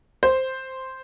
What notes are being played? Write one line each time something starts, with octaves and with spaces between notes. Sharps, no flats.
C5